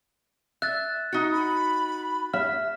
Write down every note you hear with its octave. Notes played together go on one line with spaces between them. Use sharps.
E5 F#6 A6
D#4 F#4
B5
E5 F6